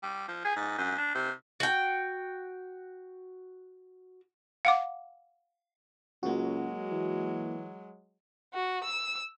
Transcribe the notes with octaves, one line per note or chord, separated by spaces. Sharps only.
G3
F3
G#4
G#2
F#2
D4
C3
F#4 G5
F5 F#5 D6
C#2 F#3 G#3 A#3 F#4
E3
F#4
E6